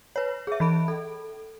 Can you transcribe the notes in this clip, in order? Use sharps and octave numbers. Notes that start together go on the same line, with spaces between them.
B4 C#5
G#4 E5
E3 B5 D7
A4